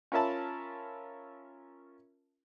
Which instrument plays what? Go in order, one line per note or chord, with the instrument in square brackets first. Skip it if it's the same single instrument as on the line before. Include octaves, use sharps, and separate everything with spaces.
[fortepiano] C#4 F4 A#4 E5 A5 B5